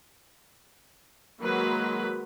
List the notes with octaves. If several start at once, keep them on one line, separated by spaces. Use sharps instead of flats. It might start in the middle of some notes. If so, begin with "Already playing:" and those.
D#3 F#3 G#3 A#3 B4 B5